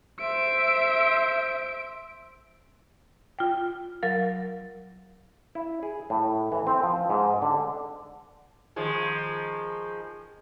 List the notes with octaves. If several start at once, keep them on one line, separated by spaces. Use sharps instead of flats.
C5 E5 D7
F4 G5
F#3 A#4 F5 A6
E4
G#4
A2
E3
C4
F3
G#2
D3
D#3 F3 G#3